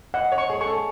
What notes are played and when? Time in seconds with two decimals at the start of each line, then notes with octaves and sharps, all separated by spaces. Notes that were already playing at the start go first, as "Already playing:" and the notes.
0.14 D#5 F#5
0.32 C#5
0.38 C#6
0.49 G#4
0.61 G#4 C#6
0.67 A4